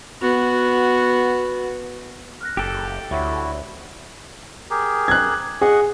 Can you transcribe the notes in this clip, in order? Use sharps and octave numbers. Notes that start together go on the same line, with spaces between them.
B3 F#4
F6 F#6 A#6
F#1 G4 A4
D2 E4 F#4 C#5 E5
G4 G#4 A#4
F#6 G#6
G#4 D#5 F#5 C#6